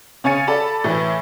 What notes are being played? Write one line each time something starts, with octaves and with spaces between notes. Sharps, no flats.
C#3 C#5 G#5 A6 C#7 D#7
A4 D5 A5 B5
A2 E3 B4